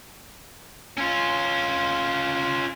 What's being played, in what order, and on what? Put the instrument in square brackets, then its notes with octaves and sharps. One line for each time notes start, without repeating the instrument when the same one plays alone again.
[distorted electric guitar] C#4 F4